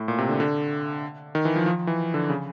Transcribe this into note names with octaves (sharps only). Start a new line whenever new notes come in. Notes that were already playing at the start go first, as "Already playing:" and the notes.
Already playing: A2
A#2
C3
D3
D3
D#3
E3
F3
F3
E3
D3
C#3